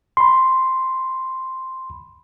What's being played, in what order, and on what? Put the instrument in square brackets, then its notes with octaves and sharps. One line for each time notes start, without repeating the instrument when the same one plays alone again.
[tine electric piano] B5 C6